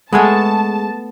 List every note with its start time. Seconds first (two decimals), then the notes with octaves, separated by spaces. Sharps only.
0.13 G#3 A3 B3 G#4 G#5 A5